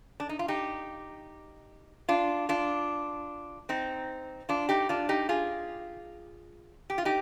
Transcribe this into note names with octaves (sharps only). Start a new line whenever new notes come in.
D4
D#4
F4
D#4 G4
D4 F4
D4 F4
C4 D#4
D4 F4
D#4 G4
D4 F4
D#4 G4
F4 G#4
G4
F4
D#4 G4